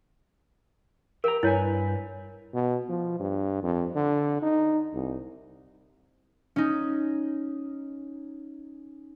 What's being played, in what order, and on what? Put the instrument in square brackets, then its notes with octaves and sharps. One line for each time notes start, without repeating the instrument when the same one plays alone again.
[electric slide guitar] G4 G5 A#5 [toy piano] A#4
[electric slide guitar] G2 B4 G#5 [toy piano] E4 C#5
[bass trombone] B2
F3
G2
F2
D3
D#4
C2
[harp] C#4 D#4